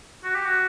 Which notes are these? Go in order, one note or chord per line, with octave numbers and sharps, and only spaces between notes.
F#4
G4
F#4